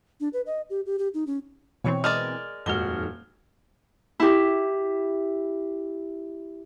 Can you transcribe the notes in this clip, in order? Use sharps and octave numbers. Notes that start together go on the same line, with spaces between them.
D4
B4
D#5
G4
G4
G4
D#4
C#4
B2 E3 C4 C#5 C#6
G#3 A#4 D5 F6
D#1 F2 G#2 F#4 F6 G7
E4 G4